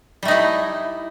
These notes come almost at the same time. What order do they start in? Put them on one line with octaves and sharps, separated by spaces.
G3 A3 D#4 E4